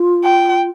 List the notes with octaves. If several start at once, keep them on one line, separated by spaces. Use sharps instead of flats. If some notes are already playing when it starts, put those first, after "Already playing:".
Already playing: F4
G5